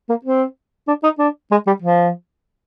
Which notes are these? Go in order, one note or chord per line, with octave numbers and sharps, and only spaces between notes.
A#3
C4
D4
D#4
D4
G#3
G3
F3